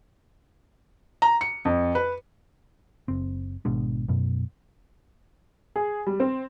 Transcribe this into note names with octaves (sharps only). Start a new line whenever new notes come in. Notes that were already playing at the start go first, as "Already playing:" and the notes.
A#5
C#7
F2
B4
F#1 C4
G#1 B2 G#3 D4
F#2 B2
G#4
G3
C4